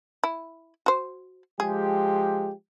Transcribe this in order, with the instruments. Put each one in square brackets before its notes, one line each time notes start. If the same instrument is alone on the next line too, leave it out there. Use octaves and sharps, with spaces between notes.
[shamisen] E4
F#4 C5
[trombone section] F3 G#3 G4 [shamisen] G#4